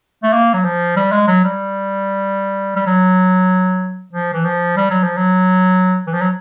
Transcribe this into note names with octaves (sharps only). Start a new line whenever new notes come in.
A3
A#3
F#3
F3
G3
G#3
F#3
G3
G3
F#3
F3
E3
F3
G3
F#3
F3
F#3
E3
F3
F#3